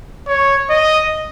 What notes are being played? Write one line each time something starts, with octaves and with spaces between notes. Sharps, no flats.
C#5
D#5